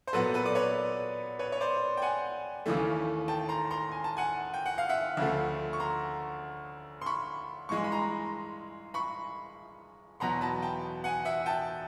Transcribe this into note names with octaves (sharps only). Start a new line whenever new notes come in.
C5
A#2 F#3 B3 A4 B4
A4 B4
D5
B4 C#5
B4 C#5
C#5
C5 D5
G5
F#5 G#5
D#2 C#3 E3 A3
G5 A5
A#5 C6
A#5 C6
G#5
A5
F#5 G#5
G5
F#5
F5
E5 F#5
D2 C#3 F3 A3
C#6
A#5 C6
C6
B5 C#6
G2 E3 G#3 C#6
C6
B5
A#5 C6
B5 C#6
E2 B2 F#3 B3 A#5 C6
A5 B5
G5 A5
F#5 G#5
E5 F#5
G5 A5